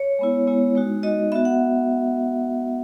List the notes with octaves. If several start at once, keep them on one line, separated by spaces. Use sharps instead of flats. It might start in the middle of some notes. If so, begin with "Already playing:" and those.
Already playing: C#5
G#3 B3 E4
G#3 B3 E4
G#3 D#4 F#4
G#3 D#4 F#4 D#5
B3 F#4 E5
F#5